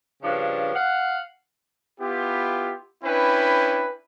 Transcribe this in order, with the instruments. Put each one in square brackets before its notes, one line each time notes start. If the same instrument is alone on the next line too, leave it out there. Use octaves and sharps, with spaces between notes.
[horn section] G2 C#3 F3 D4
F5 F#5
[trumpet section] B3 E4 F4 G4
C#4 D4 E4 B4 G5 B5